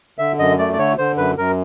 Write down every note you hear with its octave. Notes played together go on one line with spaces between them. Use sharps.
D3 E5
F#2 D#5
A3 D5
D5
D3 C#5
D3 C5
F#2 B4
F#2 A#4